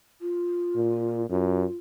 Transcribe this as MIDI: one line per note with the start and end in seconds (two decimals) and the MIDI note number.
0.21 1.22 65
0.75 1.27 46
1.29 1.65 42
1.29 1.75 65